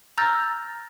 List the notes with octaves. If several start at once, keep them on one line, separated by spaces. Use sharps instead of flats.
A#5 E6 F6 G6 A6 A#6